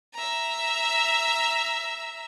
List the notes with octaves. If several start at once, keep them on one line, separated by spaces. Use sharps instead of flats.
E5 A#5